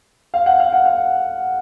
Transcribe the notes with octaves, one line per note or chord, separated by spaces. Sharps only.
F5
F#5
F5
F#5
F5